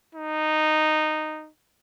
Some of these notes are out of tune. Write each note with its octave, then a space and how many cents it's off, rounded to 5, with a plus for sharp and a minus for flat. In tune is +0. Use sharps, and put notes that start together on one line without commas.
D#4 -10